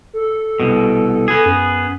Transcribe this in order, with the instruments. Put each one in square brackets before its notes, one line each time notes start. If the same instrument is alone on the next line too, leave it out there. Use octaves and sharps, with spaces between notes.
[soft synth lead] A4
[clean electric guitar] C2 B2
B3 G#4
[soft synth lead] F#2